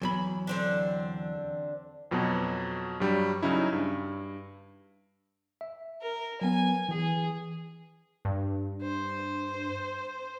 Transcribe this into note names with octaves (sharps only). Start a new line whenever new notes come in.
E2 F#3 B5
D3 C4 D4
F2 B2 F#3
G2 F#3 G3
C#3 F#3 C#4 D#4 E4
G2
E5
A#4
F#3 B3 G#5
E3 G#4
G2
C5